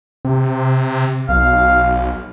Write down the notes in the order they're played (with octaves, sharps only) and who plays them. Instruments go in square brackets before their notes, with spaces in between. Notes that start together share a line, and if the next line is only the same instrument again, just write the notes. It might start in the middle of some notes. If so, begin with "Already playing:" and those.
[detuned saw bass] C3
[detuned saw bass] B1 [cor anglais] F5